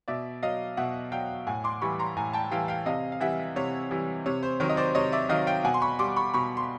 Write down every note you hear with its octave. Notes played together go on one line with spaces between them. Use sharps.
B2 D5 E5
F#3 D#5 F5
B2 E5 F#5
F#3 F5 G5
A2 F#5 G#5
C6 D6
E3 G3 B5 C#6
A#5 C6
A2 G#5 A#5
G5 A5
E3 G3 F5 G5
F5 G5
C3 D#5 F5
F5
E3 G3 E5 F#5
C3 C#5
E3 G3
C3 C#5
C5
D#3 F#3 C#5
D#5
C5 D5
C3 C#5 D#5
D5 E5
D#3 F#3 D#5 F5
F5 G5
B2 F#5 G#5
C6
B5 C#6
G3 C6 D6
B5 C#6
B2 B5 C#6
C6